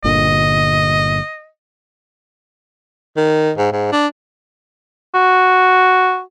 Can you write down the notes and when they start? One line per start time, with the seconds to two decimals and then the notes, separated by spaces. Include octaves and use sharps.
0.04 G1 A#2 D3 D#5
3.17 D#3
3.58 G#2
3.73 G#2
3.92 D4
5.15 F#4